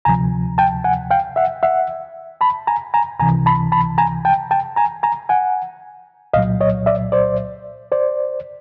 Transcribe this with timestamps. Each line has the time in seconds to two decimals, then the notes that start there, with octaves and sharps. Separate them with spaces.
0.05 D2 C3 F3 G#5 A#5
0.58 G5 A5
0.84 F#5 G#5
1.11 F5 G5
1.36 E5 F#5
1.63 E5 F#5
2.41 A5 B5
2.67 G#5 A#5
2.94 G#5 A#5
3.19 C#2 C3 E3 G#5 A#5
3.46 A5 B5
3.72 A5 B5
3.98 G#5 A#5
4.25 G5 A5
4.51 G5 A5
4.76 G#5 A#5
5.03 G#5 A#5
5.29 F#5 G#5
6.34 C2 A#2 F#3 D#5 F5
6.61 C#5 D#5
6.86 D5 E5
7.12 C5 D5
7.92 C5 D5